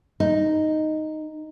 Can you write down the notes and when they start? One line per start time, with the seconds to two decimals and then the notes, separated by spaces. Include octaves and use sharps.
0.20 D#4